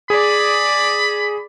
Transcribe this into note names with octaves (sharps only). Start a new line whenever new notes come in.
G#4 D5 B5